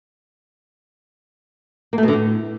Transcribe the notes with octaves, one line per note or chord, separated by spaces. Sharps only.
A#3
A3
B2
D3
A2